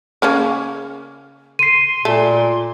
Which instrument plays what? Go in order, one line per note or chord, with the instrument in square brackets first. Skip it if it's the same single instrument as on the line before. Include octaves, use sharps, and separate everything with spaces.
[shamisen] C#3 A#3 C#4
[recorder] C6 [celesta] C7 D#7
[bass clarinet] A#2 [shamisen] A3